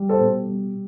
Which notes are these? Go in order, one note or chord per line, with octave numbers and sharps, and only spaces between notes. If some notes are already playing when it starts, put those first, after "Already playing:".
Already playing: G3
A4 C5
B2
G3